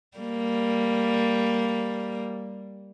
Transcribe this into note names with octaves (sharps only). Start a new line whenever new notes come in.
G3 A#3